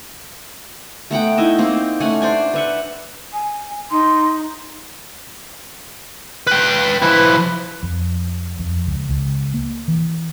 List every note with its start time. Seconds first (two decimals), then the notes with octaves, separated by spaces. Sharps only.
1.11 A3 B3 F#5 G5
1.38 D#4 E4 D#5 E5
1.58 A#3 C4 D#4
2.00 A3 C#4 F#5 G#5
2.22 D4 C5 D5 G#5
2.54 B4 E5 F#5
3.32 G#5
3.91 D#4 C6
6.47 B4 G5
7.02 F3 E4 B4
7.83 F2
8.59 F2
8.87 C#2
9.09 C#2
9.54 A#3
9.88 E3